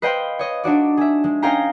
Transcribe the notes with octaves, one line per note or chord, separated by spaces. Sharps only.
B4 C5 D#5 F5 G5 B5
C#5 D#5
D4 D#4 F#4 D5
G#4 E5
G#3
C#4 D#4 G#4 F5 G5 A#5